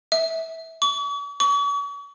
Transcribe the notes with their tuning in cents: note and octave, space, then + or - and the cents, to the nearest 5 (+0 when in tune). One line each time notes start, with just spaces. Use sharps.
E5 -20
C#6 +45
C#6 +40